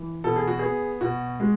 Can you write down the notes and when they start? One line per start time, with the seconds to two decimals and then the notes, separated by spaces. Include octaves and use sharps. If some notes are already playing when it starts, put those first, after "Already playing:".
Already playing: E3
0.24 B2 A4
0.36 G#4
0.47 F#4
0.59 B3 G#4
1.01 B2 F#4
1.40 G#3